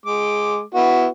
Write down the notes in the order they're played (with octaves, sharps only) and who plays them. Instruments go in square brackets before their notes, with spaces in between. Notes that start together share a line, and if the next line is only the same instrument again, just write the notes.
[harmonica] G#3 D6
B3 E4 F#4